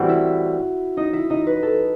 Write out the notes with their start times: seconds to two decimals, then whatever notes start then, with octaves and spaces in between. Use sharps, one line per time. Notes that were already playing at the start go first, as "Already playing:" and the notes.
Already playing: A2 E3 G3 C4 F#4 F#5
0.09 E4 E5
0.97 D#4 D#5
1.13 E4 E5
1.30 D#4 D#5
1.47 B4
1.63 A4